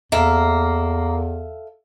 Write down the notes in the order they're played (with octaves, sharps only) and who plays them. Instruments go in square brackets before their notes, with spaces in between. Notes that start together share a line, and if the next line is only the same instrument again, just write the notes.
[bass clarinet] E2 [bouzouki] A#3 [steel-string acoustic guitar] A4 E5 F5